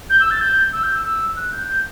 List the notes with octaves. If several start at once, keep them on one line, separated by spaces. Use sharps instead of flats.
G6
E6
A6
G6
E6
G6
E6
E6
F#6
G6
G6